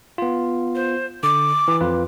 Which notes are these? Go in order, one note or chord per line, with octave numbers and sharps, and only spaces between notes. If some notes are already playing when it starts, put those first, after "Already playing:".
B3 F4
C5
D3 D6
E3
F2 F4 B4